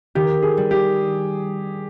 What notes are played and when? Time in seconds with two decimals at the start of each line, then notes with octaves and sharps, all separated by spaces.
0.15 D#3 G4
0.43 G#4
0.57 G3
0.71 G4